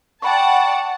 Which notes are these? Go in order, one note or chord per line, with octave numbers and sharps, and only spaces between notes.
D5 F#5 G5 A5 B5 C#6